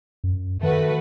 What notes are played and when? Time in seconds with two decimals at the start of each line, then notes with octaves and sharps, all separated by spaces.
0.24 F#2
0.63 D#3 A3 F#4 B4